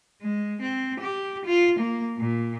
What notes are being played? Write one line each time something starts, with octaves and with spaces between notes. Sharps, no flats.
G#3
C4
G4
F4
A#3
A#2